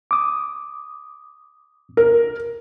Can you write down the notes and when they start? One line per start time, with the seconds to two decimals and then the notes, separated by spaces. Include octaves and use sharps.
0.11 D6 D#6
1.97 A#4